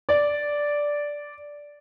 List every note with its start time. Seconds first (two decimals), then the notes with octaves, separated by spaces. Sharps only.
0.09 D5